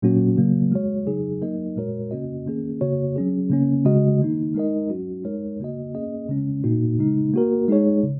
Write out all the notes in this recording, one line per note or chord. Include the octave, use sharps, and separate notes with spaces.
A#2 F#3 A#3 C#4 F#4
C#3 F#3 A#3
G#3 F#4 C#5
C#3 F#3 D#4 G#4
F#3 A#3 D#4 A#4 D#5
A#2 G#3 F#4 A#4 C#5
C#3 A#3 C#4 F#4 D#5
D#3 A#3 C#4 G#4
C#3 A#3 F#4 C#5
F#3 C#4 G#4
C#3 A#3 C#4
C#3 G#3 F#4 D#5
D#3 A#3 D#4
G#3 D#4 A#4 D#5
F#3 C#4 F#4
G#3 D#4 A#4 C#5
C#3 A#3 F#4 D#5
A#3 C#4 G#4 D#5
C#3 G#3 C#4
A#2 A#3 D#4 F#4
C#3 G#3 D#4
A#3 F#4 A#4
G#3 D#4 G#4 C#5
C#3